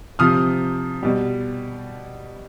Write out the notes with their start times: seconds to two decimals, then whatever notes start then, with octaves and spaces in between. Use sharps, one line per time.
0.19 C3 F3 D#6 F6
1.03 B2 G3